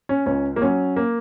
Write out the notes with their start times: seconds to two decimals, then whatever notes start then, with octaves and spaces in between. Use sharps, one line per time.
0.09 C#4
0.26 C#2 C#4
0.56 A#3
0.62 F#3 C#4
0.96 A#3